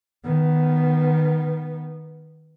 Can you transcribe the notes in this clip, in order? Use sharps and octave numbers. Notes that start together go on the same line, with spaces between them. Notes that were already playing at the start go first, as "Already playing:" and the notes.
D#3 B3